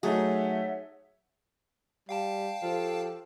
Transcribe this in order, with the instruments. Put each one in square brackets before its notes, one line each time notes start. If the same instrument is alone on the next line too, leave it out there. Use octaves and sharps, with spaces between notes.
[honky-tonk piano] F#3 A3 D#4 [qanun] G#4 [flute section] C#5 E5 F#5
[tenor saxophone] G3 [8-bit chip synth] F5 G5 A5
[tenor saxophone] F3 [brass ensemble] G4 A4